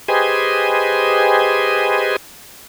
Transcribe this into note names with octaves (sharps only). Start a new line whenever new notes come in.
G4 G#4 B4 C5 D#5 G#5